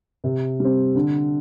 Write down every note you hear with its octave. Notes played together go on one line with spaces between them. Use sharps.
C3
G3 C4
D3